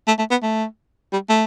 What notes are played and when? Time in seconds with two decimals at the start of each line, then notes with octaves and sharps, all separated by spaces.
0.08 A3
0.19 A3
0.31 B3
0.43 A3
1.13 G3
1.30 A3